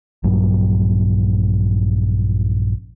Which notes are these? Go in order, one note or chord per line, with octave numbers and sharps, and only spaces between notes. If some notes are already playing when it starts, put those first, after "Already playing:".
A#1 G2 F#3